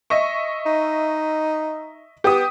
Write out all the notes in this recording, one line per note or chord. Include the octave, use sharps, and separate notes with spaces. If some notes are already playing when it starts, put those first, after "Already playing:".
D#5 E5 C#6
D#4
B3 G4 D#6